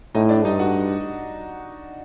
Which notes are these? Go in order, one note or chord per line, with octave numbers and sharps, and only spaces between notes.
A2 D#4 D#5
D4 D5
G2 D#4 D#5
F#4 F#5